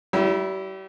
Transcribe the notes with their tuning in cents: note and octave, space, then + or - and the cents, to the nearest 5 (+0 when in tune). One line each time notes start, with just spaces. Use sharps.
G3 -40 E4 +0